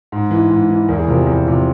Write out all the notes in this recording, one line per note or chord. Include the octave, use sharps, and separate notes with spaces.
G#2
E3
G#2
E3
E2 A#4
G#4
C3 F3 A#4
E2
C3 F3